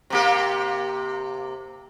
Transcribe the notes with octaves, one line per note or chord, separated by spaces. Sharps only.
C3 A#3 G4